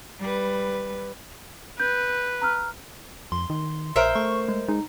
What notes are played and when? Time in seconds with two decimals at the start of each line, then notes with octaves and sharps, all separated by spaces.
0.20 G3 B4
1.80 B4 G6
2.42 A#5 E6 F6
3.32 F2 C6
3.50 D#3
3.96 A#1 A#4 C5 E5
4.15 A3 C#6
4.48 G#3
4.68 G#3 D#4